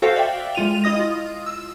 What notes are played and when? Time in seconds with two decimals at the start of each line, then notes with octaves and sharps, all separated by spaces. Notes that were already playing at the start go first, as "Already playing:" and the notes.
0.02 F#4 A4 C5 F5 G5
0.16 D5 E5 G5
0.55 G#3 F4 D#7 F7
0.84 E4 D#5 D#6 A#6
0.99 F4
1.46 E6